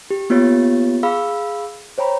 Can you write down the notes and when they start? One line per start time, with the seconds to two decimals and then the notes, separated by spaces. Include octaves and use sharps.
0.10 G4
0.30 A#3 B3 F4 G4 C#5 A6
1.03 G#4 F5 B5 E6
1.98 C5 C#5 G5 A#5 B5